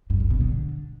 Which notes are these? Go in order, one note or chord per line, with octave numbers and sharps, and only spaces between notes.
G2
G2
B2
D3